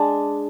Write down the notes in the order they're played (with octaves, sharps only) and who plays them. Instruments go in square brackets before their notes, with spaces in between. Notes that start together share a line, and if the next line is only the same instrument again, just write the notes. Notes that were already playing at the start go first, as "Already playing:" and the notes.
Already playing: [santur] G#3 D4